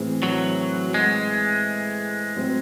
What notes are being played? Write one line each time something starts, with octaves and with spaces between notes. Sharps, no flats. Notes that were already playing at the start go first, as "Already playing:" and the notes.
Already playing: A2 E3 C4 E4 G#4
F#3
G#3
A2 F#3 C4